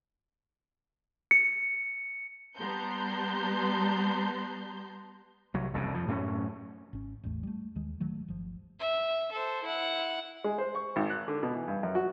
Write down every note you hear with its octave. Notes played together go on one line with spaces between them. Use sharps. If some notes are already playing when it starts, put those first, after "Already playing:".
C#7
G3 B3 A5 A#5 C6 G6
C2 F#3
F1 C2 G2 C#3
F2 F3
F#2 A2 B3 C#4
G#1 C#4
A1 E2 A3
G3 A3
D#2 D#3 G#3
D1 D#3 F#3 A3
G1 F3
E5
A4 C5
E4 F#5
G#3
C5
C#6
G#1
F#6
D3
B2
E3
G2
F#2
F#4